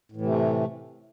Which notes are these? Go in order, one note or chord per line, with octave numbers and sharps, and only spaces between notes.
A2 C3 E3 A3